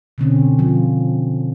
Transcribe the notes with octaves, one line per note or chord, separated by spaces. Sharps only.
B2 D3 C4 C#4
F3